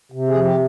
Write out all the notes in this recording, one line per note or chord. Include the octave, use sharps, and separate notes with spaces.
C3
G#4
F3
G4